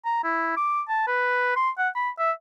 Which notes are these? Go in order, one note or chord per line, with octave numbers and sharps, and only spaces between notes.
A#5
E4
D6
A5
B4
C6
F#5
B5
E5